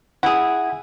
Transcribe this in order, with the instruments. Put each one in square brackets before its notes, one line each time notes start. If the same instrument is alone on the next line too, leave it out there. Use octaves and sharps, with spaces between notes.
[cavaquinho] E4 G#4 [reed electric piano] F#5